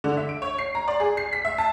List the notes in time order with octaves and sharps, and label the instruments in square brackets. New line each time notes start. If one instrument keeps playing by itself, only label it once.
[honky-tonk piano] D3
E5
D7
C#5
C7
A#5
D5
G#4
C7
B6
E5
A5